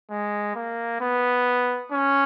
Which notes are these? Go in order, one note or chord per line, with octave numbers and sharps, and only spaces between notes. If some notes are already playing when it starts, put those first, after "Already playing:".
G#3
A#3
B3
C#4